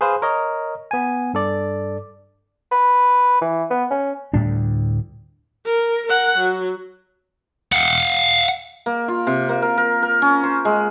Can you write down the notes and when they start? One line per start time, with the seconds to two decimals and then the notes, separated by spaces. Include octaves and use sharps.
0.01 G#4 B4 C5 F5
0.22 A#4 C#5 D#5
0.91 B3 G#5
1.34 G2 A4 D5
2.72 B4
3.41 E3
3.70 B3
3.91 C#4
4.33 D2 A2 G3 D4
5.66 A#4
6.07 A#4 F#5
6.38 F#3
7.72 F5 F#5
8.86 A#3
9.08 F4
9.27 C3
9.49 A#3
9.62 A#4
9.77 A#4
10.03 A#4
10.22 C#4
10.44 C5
10.65 G#3